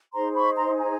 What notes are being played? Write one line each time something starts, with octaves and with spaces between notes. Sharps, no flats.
D#4 G#4 C5 A#5 C6
B5 C#6
A#5 C6
G#5 A#5